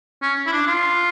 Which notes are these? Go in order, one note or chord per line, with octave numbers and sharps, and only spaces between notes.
C#4
E4
D4
F4